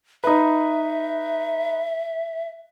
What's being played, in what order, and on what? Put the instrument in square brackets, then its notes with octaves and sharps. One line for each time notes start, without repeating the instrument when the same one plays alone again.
[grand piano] D#4 B4 [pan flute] E5